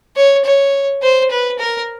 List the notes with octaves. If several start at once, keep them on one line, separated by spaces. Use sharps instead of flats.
C#5
C#5
C5
B4
A#4